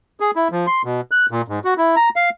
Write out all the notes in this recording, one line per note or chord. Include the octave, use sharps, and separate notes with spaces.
G#4
E4
F3
C6
B2
F#6
A#2
G#2
F#4
E4
A#5
F5